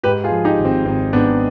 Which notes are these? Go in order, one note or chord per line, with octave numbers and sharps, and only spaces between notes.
G#2 G4 B4
F4 G#4
F3
D#4 G4
G#1
C4
G#1 C4
G#2 B3 D4